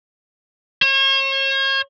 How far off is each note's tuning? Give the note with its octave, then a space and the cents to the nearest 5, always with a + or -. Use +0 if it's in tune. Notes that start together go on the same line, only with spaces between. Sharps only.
C#5 -40